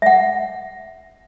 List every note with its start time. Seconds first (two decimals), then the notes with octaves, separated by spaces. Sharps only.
0.02 E5 F#5